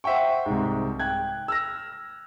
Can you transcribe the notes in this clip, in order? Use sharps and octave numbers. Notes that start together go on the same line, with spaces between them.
C5 E5 F#5 G5 C#6
C2 G#2
G5 F#6 G#6
E6 F6 A#6